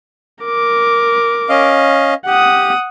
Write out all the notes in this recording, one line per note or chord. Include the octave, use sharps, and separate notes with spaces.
A#4 D6
C#4 D#5 F5
G4 F#5 D#6